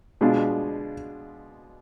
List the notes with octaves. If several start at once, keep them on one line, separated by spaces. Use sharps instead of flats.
B2 G#3 D4 F4